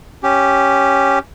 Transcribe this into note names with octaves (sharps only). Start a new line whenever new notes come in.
C#4 G4